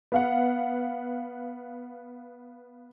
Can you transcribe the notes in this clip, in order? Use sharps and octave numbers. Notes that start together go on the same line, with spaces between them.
B3 F5 F#5